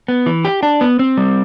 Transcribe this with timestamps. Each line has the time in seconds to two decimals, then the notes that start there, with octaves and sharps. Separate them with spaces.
0.08 B3
0.26 E3
0.45 G4
0.63 D4
0.81 B3
0.99 C4
1.17 G3